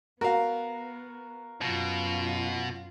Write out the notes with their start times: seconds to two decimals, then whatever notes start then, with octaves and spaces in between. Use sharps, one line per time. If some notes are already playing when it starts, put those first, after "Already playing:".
0.21 B3 F#4 A#4 F5
1.61 F#2 B2 F4